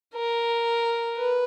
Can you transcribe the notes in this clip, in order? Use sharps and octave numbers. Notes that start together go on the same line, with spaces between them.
A#4
B4